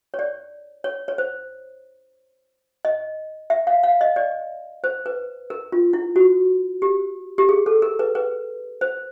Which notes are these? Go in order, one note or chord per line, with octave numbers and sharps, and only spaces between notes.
C#5
D5
C#5
C#5
C5
D#5
E5
F5
F5
D#5
D5
C5
B4
A#4
F4
E4
F#4
G4
G4
G#4
A4
A#4
B4
B4
C5